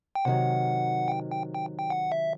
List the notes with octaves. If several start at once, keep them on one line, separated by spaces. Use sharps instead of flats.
G5
C3 D#3 F#3 F#5
G5
G5
G5
G5
F#5
E5